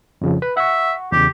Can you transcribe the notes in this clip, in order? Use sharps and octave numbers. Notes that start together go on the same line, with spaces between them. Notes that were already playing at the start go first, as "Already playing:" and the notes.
F2 C#3 F3
B4 B5
E5 F#5 C#6
E2 C#3 G4